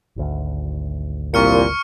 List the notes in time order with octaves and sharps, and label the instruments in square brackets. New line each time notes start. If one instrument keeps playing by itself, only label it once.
[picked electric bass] G#1 D2
[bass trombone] C2 [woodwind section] A#2 [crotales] C#6 F6 C#7